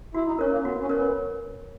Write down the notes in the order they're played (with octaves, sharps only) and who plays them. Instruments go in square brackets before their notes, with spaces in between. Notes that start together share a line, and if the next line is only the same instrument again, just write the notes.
[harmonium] E4 [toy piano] F#4
[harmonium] D#4
[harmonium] C#4 [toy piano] A#4 C#5
[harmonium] A#3
[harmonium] B3 [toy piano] F#4
[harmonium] C#4
[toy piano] A#4 C#5
[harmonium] B3